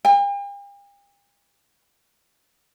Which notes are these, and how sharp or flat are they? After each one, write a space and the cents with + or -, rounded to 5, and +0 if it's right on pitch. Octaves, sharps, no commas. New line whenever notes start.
G5 +45